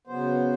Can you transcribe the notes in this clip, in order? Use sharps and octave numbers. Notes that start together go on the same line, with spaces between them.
C#3 F#3 B3 C5